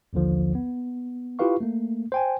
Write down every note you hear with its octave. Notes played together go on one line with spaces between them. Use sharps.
A#1 D#2 D3 F3
B3
E4 F4 G4 B4 F5 C#6
A3 A#3
C5 G5 G#5